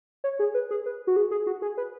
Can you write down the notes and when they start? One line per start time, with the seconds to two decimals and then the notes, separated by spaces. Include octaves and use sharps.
0.24 C#5
0.39 G#4
0.54 B4
0.71 G#4
0.86 B4
1.07 F#4
1.16 G#4
1.31 G#4
1.47 F#4
1.62 G#4
1.78 B4